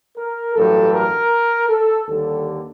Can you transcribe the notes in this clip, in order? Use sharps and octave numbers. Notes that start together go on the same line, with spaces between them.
A#4
A1 G2 F#3 A4
A#4
A4
D#2 D3 G3 A4